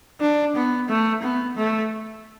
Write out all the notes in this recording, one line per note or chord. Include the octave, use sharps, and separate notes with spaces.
D4
B3
A3
B3
A3